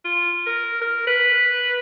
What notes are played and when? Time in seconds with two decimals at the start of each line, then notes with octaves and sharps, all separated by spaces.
0.05 F4
0.47 A#4
0.82 A#4
1.07 B4